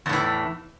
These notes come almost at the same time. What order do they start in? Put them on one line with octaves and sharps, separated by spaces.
E2 A2 E3